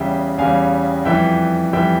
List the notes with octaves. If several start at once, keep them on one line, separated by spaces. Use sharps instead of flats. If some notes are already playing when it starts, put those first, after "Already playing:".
Already playing: E2 C#3 G3 E5 G5
E2 C#3 G3 F5 G#5
F2 E3 G3 E5 G5
F2 E3 G3 E5 G5